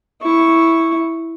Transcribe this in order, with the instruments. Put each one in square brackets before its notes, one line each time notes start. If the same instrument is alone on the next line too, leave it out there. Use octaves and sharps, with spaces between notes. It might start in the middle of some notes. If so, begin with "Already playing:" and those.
[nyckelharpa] E4 C#6